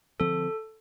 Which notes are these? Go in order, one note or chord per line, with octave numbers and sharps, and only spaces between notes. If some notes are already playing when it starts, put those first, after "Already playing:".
D3 F3 C4 A4